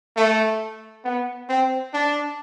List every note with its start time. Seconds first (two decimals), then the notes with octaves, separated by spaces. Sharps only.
0.16 A3
1.05 B3
1.49 C4
1.94 D4